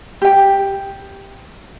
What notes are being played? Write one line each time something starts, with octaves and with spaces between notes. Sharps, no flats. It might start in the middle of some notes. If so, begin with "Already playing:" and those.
G4 G5